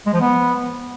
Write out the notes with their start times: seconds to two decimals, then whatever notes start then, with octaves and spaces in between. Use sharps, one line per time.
0.06 G#3
0.13 F3
0.21 B3